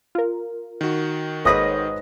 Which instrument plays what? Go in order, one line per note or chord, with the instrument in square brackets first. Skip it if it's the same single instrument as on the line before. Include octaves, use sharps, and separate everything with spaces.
[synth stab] F4 A#4
[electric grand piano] D#3 F#4
[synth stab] G#1 [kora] G#2 B4 D#5 [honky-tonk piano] C#5 D#6 A#6